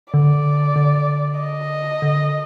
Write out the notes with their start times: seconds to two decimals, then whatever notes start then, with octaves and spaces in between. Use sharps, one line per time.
0.13 D3 D5
0.76 D3
1.39 D#5
2.02 D3